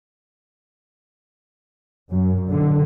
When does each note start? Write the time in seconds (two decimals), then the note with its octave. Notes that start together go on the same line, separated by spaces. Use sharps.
2.12 F#2
2.50 D3